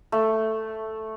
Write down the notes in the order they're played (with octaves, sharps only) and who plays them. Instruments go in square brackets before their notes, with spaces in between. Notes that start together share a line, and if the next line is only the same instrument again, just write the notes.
[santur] A3